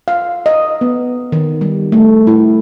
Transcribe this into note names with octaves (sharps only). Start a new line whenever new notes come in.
F5
D#5
B3
D#3
G3
A3
E4